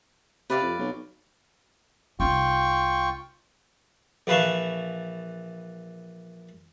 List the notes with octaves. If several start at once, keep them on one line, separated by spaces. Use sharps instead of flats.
C3 B4 D5 F5
F2
B1
C2 D#4 F4 G5 C#6
A#1 E3 B4 F5 A5 C#6